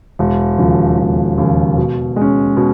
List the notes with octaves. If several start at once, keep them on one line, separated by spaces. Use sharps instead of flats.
E1
D#2 C#3 F3
E1
D#2 C#3 F3
B2
G#3
C#4
B2